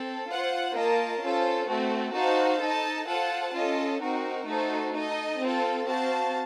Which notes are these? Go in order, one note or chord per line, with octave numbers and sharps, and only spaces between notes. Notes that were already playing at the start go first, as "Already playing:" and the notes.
Already playing: C4 A4
F4 C5 F#5
A#3 F4 A#4 D#5 A5
C#4 F4 A4 C5
A3 C4 F#4 A4
D#4 F#4 C5 F5 A5
D#4 A4 D#5 A5
F4 A4 C5 F#5 A5
C#4 F4 A4 D#5
C4 D#4 F#4 A#4
A3 D#4 F#4 A4 C5
D#4 A4 D#5
C4 F4 A4
C4 F#4 C5 F5 A5